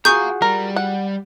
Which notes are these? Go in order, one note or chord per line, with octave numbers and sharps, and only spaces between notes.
F4 F#4 G#4 F5 A#5 C#6 G6
G3 A#4
F#5